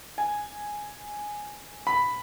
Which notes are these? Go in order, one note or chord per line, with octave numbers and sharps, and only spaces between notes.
G#5
B5